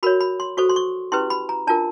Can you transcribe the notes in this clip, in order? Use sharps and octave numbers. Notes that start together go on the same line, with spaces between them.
F#4 A#4 C#5 B5
B5
C6
F#4 A4 C5 C#6
C6
C#6
C#4 E4 G4 B4 C6
B5
A#5
D4 F4 A#4 A5